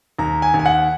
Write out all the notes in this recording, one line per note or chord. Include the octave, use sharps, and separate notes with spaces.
D#2 A#5
G#5
D#2
G#5
F#5